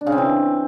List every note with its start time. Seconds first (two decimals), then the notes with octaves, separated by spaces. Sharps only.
0.01 D4
0.07 C#3
0.12 C4
0.18 E3